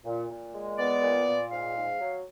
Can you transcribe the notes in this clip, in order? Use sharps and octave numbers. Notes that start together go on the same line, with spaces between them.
A#2
A#2
G#3
B3 D5
A#2
A#2
G#2 F5
G#2
F#3